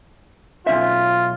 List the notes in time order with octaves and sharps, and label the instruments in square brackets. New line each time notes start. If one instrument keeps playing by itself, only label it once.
[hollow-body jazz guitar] B1 C#4 E5 [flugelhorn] F4